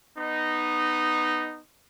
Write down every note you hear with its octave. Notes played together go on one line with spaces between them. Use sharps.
B3 D#4